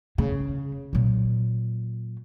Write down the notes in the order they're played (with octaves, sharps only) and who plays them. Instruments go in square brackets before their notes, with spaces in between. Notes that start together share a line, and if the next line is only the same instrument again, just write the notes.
[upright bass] C#3
A#2 F#3